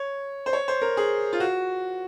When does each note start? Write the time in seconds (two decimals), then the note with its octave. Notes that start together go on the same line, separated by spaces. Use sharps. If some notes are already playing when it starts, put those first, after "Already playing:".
Already playing: C#5
0.46 C5
0.53 C#5
0.68 C5
0.82 A#4
0.97 G#4
1.33 F4
1.40 F#4